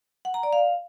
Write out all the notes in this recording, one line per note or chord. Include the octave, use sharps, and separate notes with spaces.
F#5
A#5
D5
F5